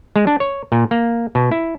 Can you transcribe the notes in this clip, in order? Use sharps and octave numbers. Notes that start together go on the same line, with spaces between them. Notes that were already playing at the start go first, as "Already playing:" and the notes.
G#3
D4
C#5
A#2
A#3
B2
E4